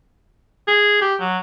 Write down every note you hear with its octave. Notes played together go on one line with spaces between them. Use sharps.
G#4
G4
F#3